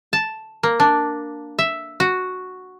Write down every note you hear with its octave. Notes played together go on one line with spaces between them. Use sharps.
A5
A#3
D4
E5
F#4